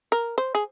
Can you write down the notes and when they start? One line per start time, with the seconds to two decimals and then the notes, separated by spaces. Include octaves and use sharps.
0.12 A#4
0.38 C5
0.55 G#4